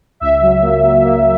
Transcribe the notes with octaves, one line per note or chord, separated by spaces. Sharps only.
C#2 E5
F#3
A#3
F#3
A#3